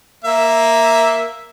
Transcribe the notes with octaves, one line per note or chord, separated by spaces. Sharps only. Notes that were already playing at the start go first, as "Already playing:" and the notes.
A#3 E5